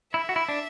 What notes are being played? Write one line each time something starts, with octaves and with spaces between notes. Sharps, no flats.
E4 E5
F#4
E4
D4